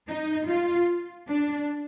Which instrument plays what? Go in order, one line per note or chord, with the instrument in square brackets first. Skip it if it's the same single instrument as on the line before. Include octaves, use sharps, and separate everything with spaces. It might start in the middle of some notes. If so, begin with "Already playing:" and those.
[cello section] D#4
F4
D4